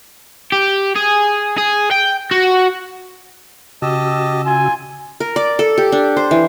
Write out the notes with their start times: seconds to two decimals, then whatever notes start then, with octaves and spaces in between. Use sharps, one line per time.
0.52 G4
0.96 G#4
1.58 G#4
1.91 G5
2.31 F#4
3.82 C#3 F#4 G4 D#5 A5 E6
4.46 F4 G#5
5.20 A#4
5.36 D5
5.59 A4
5.78 G4
5.92 D4
6.17 C5
6.31 E3